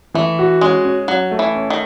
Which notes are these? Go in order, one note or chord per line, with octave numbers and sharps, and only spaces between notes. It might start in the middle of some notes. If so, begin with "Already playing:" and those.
E3 A3
F#4
G#3 C#4
C#4
F#3 C#4
A3
E3
C#4
D#3